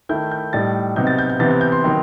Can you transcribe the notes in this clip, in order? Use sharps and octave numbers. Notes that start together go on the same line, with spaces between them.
D#3 A3 E4 G6
G6
A2 G3 D#4 A6
C3 F#3 B3 D#4 G6
A6
G6
G6
C3 E3 B3 E4 A6
G6
G6
C6
D#3 F#3 B3